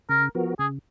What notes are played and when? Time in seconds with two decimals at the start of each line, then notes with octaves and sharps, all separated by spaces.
0.09 C#3 A#4
0.35 F3 B3 F#4 A#4
0.59 C#3 G#4